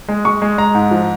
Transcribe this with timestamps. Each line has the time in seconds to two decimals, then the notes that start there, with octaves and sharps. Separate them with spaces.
0.09 G#3
0.25 G#3 C#6
0.42 G#3
0.58 G#3 A#5
0.75 G#2
0.91 F3